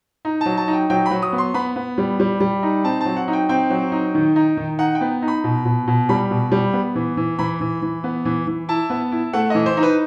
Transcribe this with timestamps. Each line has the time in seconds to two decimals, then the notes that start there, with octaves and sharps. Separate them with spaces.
0.25 D#4
0.41 F#3 A5
0.57 A5
0.68 D#4
0.73 G5
0.90 F#3 G5
1.06 B5
1.11 F#3
1.22 D#6
1.33 B3
1.38 C6
1.54 B3 B5
1.76 B3
1.98 G3
2.20 G3
2.40 G3
2.63 D#4
2.84 C4 A5
3.01 F#3 A5
3.17 F#5
3.28 D#4
3.33 G5
3.49 C4 G5
3.70 F#3
3.92 D#4
4.15 D#3
4.36 D#4
4.57 D#3
4.79 D#4 F#5
4.95 G5
5.01 B3
5.22 D#4
5.28 B5
5.44 B2
5.65 B2
5.88 B2
6.09 G3 B5
6.31 B2
6.52 G3
6.73 B3
6.95 E3
7.17 E3
7.39 E3 B5
7.61 E3
7.82 E3
8.04 B3
8.25 E3
8.47 E3
8.69 E4 A5
8.90 B3
9.12 E4
9.33 A3 F#5
9.50 E3 D#5
9.66 C5
9.77 D#4
9.83 B4